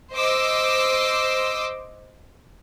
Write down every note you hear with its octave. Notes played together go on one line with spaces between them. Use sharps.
C5 D#5 D6 E6